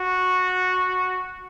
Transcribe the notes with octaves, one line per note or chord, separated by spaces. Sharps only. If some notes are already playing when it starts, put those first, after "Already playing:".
Already playing: F#4